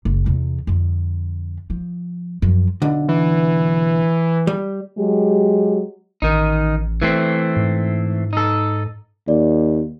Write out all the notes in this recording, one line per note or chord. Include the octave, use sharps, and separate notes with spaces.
F#1
E2 C3
F2 D3
F3
F#2 F3
B1 D3
E3
G3
F#3 G#3 G4
A1 D#3 D#4
E3 A3 C4
G#2
D#4 A4
D#2 D5